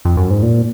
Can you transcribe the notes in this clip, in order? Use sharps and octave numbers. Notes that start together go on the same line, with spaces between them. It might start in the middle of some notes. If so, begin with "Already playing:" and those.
F2
F#2
G#2
A#2